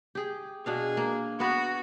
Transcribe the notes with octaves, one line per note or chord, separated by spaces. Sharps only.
G4 G#4
B2 D4 G#4 F5
A#3
B3 F#4 B4